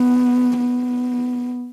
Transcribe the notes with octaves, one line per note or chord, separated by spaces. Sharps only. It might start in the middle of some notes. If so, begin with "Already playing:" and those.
Already playing: B3
B3